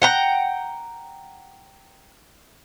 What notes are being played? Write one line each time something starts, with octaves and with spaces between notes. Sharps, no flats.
F#5 G5 A#5